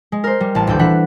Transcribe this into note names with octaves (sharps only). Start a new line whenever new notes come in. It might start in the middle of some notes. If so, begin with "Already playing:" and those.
G#3
A#4 C5
G3
A1 A5
D#1 D2 A4 G6
E3 D4 F#5 B6